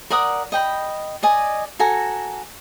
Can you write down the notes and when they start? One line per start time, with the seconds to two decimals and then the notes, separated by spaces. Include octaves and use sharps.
0.10 A#4 D5 F#5 D#6
0.52 D#5 G5 B5
1.23 D5 D#5 G#5
1.79 F#4 A4 G#5 A#5